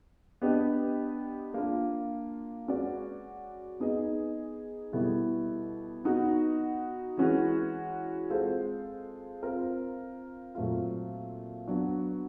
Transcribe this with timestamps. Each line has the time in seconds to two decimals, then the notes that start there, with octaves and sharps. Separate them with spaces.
0.42 B3 D4 G4 B4 D#5
1.54 A#3 D4 F4
2.67 G#3 C#4 F#4 B4 D5
3.80 B3 D#4 G#4 B4 D#5
4.92 B2 G3 B3 E4 A4
6.04 B3 D#4 F#4
7.17 E3 G#3 C#4 F#4 B4
8.30 G#3 C4 F4 A4 C5
9.43 C4 F4 A#4
10.55 A#2 F#3 A3 C4 F4
11.67 F#3 B3 D4 F#4